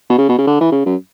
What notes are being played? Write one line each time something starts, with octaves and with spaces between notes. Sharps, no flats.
B2
C#3
B2
C#3
D3
E3
C#3
F#2